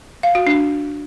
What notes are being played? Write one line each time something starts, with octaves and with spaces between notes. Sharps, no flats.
F5
F#4
D4